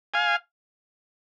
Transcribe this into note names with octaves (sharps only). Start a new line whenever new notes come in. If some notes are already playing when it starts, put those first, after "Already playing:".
F5 G#5